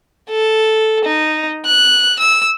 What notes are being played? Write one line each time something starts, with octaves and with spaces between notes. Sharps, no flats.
A4
D#4
F#6
E6